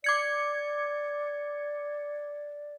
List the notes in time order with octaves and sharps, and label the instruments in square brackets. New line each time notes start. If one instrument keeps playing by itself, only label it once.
[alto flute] D5 [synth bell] D6 G#6 C#7